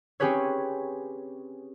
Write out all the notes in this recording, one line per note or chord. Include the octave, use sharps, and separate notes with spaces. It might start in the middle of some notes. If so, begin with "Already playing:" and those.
C4 C#4 G4 G#4 B4 C#5